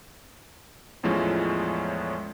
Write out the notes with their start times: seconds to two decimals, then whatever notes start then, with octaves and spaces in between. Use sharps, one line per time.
1.03 E2 A2 F3 G#3 C#4